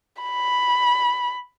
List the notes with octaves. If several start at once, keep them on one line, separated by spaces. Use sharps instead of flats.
B5